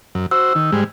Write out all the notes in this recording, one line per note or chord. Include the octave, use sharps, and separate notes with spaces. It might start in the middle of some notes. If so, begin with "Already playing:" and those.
F#2
F#4 C5 E6
D#3
G#2 G3 G#3